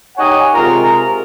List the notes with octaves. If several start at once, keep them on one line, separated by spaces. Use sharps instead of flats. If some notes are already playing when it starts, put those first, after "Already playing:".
D#4 G4 C#5 D#5 F#5 G#5
C3 G#3 F4 A#4